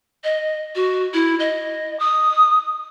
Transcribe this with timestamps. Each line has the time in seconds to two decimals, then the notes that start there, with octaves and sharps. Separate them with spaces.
0.24 D#5
0.75 F#4
1.14 E4
1.40 D#5
2.00 D#6